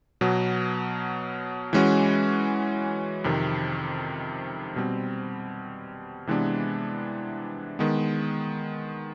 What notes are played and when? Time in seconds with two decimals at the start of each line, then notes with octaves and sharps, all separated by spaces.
0.21 B2 F#3 B3
1.73 E3 G#3 C#4 F#4
3.24 F2 C3 D#3
4.76 B2 G3 C4
6.27 C3 E3 G#3 B3 D4
7.79 D#3 G#3 B3